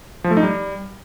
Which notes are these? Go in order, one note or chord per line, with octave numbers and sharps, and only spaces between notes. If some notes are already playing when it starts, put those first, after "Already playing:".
F3
A3
D#4
G3